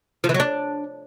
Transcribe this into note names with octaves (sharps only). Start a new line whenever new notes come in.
F3
E3
F#3
D4